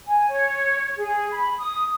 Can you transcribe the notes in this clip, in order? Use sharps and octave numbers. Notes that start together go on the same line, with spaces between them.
G#5
C#5
G#4
B5
D#6